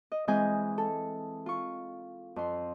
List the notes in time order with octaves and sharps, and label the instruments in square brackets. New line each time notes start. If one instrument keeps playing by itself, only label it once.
[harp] D#5
E3 G#3 C4 D#5 G#5 G6
A4
F4 C#6
F2 C6